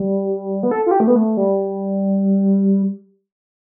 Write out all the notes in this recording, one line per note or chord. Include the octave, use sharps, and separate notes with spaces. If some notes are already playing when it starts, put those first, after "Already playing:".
Already playing: G3
B3
A4
F4
G4
A3
B3
A3
G3